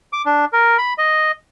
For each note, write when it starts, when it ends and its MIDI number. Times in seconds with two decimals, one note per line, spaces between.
0.13 0.22 86
0.26 0.45 62
0.53 0.77 70
0.78 0.93 83
0.98 1.32 75